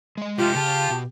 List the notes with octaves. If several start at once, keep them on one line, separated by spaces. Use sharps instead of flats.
G#3 D#5
C3 A3 F4 G4
C#3 F4 A5
B2